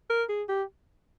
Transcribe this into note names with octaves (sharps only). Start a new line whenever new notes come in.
A#4
G#4
G4